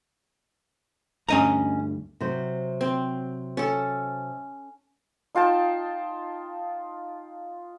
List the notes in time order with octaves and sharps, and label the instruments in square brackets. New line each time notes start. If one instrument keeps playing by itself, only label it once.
[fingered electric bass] D2 G2 [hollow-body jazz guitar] C#4 D#5 A#5
[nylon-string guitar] C3 F#3 C5
[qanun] C4
C#4 A4
[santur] D#4 F4 G5 A5